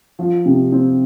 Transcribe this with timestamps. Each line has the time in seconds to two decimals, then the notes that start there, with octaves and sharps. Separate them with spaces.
0.19 F3
0.46 C3
0.72 C4